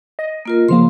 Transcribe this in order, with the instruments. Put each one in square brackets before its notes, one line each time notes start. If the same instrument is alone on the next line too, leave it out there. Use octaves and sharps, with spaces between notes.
[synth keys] D#5
[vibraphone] A#3 F4 A#4
[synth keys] C#3 F3 A#3 [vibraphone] C6